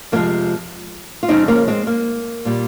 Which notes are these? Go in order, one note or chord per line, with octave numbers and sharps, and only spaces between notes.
F2 C3 F3 G#3 A#3
F4
F2 C#3 G#3 C4 D#4
A#3 C#4
G#3 C4
A#3
A#2 G3